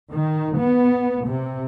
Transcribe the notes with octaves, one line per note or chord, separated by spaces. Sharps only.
D#3
B3
C3